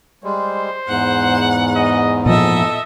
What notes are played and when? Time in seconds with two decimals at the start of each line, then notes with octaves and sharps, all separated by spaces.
0.24 G3 G#3 C5
0.88 E2 G#2 F#5
1.76 D#5
2.26 A#2 F3 A4 D#5 E5